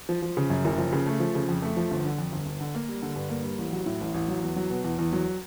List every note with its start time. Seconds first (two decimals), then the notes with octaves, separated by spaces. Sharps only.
0.09 F3
0.22 F3
0.37 C#3
0.50 F#2
0.65 F#1
0.78 F3
0.93 C#3
1.06 A3
1.20 F3
1.35 C#3
1.49 F2
1.62 A3
1.77 F3
1.91 G1
2.05 D3
2.18 F2
2.32 G1
2.46 G1
2.61 D3
2.75 A#3
2.88 G3
3.02 D3
3.16 G2
3.30 A#3
3.44 G3
3.58 A1
3.73 F#3
3.86 A2
4.01 A1
4.14 A1
4.28 F#3
4.43 E2
4.56 F#3
4.70 B2
4.84 E2
4.99 E2
5.13 F#3